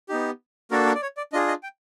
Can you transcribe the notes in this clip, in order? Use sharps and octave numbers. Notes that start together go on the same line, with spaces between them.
B3 D#4 G4
A#3 D4 F#4 A4 A#4
A#4
D5
C#5
D5
D4 F4 G#4 D#5
D#5
G5